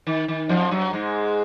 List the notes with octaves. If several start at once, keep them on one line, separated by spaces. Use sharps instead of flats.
D#3
D#3
F2 F3
F#2 F#3
G#2 G#3